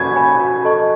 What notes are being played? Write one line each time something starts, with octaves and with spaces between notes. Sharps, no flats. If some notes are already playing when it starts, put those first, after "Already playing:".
Already playing: F#4 C#5 G#5 B5 G#6
C#5 G#5 B5
F#4
A4 D#5 A5 C#6